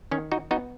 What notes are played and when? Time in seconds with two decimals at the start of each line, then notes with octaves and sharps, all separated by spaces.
0.11 D#3 C#4
0.32 D#4 F#4
0.51 B3 D#4 F#4